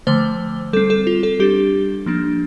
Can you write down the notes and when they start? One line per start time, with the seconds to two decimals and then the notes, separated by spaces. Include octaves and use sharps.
0.07 D3 F3 A3 C5
0.73 G3 A4
0.77 C4
0.90 A4
1.07 F4
1.23 A4
1.40 G3 D4 G4
2.06 F3 A#3 D4